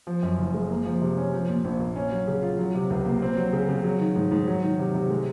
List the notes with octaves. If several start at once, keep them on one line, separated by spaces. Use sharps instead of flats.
F3
F#2
F#1
G#3
A#3
F3
C3
C#4
F3
A#2
A#1
A#3
C#4
F#3
C#3
F4
F#3
C3
C#2
A#3
C4
F#3
C#3
C#3
F#3
D#3
G#2
G#2
F#3
D#3
C3
C3
G#3